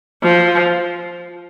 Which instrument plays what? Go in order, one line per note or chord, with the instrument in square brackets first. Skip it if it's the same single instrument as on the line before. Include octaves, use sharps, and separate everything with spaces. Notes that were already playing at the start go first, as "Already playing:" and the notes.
[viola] F3